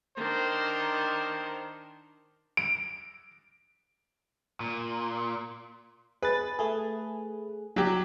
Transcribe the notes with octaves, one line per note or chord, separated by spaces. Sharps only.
D#3 D4 C5
D7
A#2
G#4 B4 A6
A3 G#4
F#3 G4